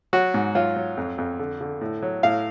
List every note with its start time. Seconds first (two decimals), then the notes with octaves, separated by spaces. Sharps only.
0.13 F#3 F#4
0.34 G#2
0.55 F#3 F4
0.76 F#3
0.97 F2
1.18 F2
1.39 D3
1.61 D3
1.81 A2
2.02 F#3
2.23 A2 F5